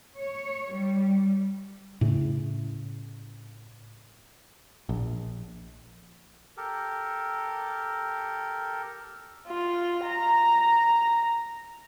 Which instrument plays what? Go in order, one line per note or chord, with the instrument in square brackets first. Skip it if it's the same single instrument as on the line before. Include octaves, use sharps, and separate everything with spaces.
[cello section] C#5
G3
[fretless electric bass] A2 C#3
[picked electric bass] A#1
[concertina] G4 A4 A#4
[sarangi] F4
A#5